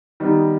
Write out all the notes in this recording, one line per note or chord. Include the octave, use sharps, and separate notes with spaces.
D#3 G3 B3 D#4